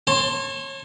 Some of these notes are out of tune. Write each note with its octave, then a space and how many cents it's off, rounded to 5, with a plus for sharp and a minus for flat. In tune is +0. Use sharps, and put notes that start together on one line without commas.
C#5 -30 A5 +20 C6 +0